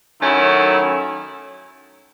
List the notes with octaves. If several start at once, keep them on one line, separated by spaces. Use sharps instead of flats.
D#3 F#3 A3 C#4 E4